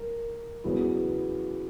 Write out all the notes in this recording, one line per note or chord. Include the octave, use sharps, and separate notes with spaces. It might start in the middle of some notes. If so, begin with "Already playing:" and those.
Already playing: A#4
E2 C#3 F#3 B3 E4